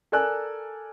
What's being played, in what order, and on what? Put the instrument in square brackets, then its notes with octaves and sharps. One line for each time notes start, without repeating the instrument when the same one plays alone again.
[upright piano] A4 A#4 D5 G#5 E6 F#6